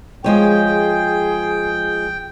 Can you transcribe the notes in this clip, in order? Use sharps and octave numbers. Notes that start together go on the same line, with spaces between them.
F3 G#3 G#4 C#5 G5